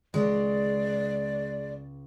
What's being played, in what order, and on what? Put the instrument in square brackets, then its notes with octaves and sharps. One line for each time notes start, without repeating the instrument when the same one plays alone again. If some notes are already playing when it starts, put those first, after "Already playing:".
[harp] C#2 C#3 [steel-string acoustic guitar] G#3 [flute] D5